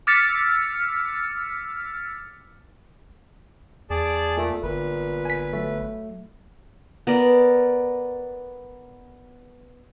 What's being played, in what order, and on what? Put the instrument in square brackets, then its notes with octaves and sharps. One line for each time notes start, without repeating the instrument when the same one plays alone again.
[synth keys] D6 E6 F6 A6 B6 C#7
[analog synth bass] E2 [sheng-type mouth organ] G#4 D5 A5
[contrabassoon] A#2 [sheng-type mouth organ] A3
[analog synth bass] G1 [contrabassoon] A#2 [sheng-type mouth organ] B4
[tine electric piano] G#5 B6
F#3 A3
[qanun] B3 A#4 D5